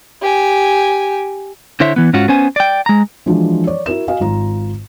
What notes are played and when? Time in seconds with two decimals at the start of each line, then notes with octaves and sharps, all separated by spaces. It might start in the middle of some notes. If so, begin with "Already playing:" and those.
0.22 G4 G#5
1.80 D3 E4 C5 C#5 E5
1.96 E3 B3
2.13 G#2 C#4 F4 F#4
2.28 B3 C#4 C5 G#5
2.56 D5 G5
2.86 G#3 A#5
3.26 E3 F3 G#3 D4 F4 F#4
3.67 C#5 D5
3.86 E4 F#4 A#4 E7
4.08 F#4 D#5 F5 G#5
4.20 G#1 F4 A#5